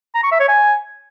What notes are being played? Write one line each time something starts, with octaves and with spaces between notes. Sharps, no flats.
A#5
C#6
E5
C#5
G#5